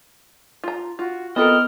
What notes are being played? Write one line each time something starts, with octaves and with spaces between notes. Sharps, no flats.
F4 A#5
F4 F#4
B3 C4 F4 A4 A#4 D#5 F6